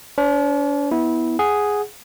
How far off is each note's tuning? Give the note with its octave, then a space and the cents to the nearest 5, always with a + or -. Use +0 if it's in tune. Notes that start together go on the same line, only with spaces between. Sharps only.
D4 -45 C5 +0
B3 -5 E4 -20
G#4 +0 F#5 +0